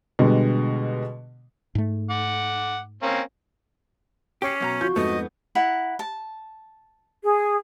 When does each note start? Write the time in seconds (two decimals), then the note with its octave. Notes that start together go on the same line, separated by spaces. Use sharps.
0.19 B2 D3 G3 G#3
1.75 G#2 A3
2.10 F#5 D6
3.02 A#3 C4 C#4
4.42 C#4 G4 D6 C7
4.60 F#2 B2 A#5
4.81 F2 F4 F#4 G6
4.96 F2 G#2 A3 B3 D#5
5.55 E4 F#5 A#5
5.99 A5
7.23 G#4